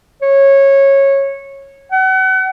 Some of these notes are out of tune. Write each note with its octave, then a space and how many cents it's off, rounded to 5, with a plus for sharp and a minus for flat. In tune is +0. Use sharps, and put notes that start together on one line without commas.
C#5 -15
F#5 +35